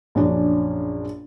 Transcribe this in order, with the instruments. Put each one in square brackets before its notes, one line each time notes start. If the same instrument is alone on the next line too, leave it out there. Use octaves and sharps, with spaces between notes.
[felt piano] A#1 F#2 C#4 D4